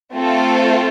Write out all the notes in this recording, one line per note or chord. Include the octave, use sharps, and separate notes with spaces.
A3 C4 F4 A4